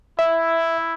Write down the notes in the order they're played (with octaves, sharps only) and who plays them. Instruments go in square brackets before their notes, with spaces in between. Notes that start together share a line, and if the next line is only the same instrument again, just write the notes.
[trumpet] E4 [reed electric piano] E5